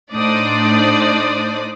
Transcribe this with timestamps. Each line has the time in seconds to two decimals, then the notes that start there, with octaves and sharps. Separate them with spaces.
0.13 A2 D4 D#4 C5 D5 D#6